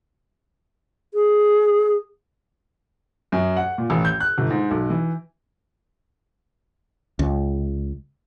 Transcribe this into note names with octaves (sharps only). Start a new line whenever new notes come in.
G#4
F#2
F#5
A#2
A1
G6
F#6
G1
G#2
B1
E3
C#2